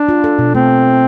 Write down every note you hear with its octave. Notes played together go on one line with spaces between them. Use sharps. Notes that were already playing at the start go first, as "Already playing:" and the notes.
Already playing: D4
F4
A4
B2
A3 C4